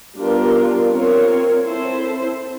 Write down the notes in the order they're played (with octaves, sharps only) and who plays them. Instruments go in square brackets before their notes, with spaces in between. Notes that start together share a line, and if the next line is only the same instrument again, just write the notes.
[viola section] G3 B3 D4 F4 A#4
C4 F4 A#4 C#5
C4 E4 A4 C5